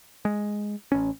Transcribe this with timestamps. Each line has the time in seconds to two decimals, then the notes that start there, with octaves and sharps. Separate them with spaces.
0.25 G#3
0.92 A1 C#4